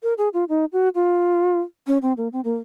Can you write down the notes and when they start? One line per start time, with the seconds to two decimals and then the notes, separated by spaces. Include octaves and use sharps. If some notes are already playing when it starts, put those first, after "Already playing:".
0.03 A#4
0.18 G#4
0.34 F4
0.49 D#4
0.73 F#4
0.95 F4
1.87 C#4
2.02 C4
2.17 A#3
2.33 C4
2.44 A#3